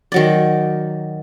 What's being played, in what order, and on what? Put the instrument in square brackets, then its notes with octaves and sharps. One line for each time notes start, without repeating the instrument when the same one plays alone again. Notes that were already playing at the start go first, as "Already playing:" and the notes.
[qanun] D#3 F#3 D5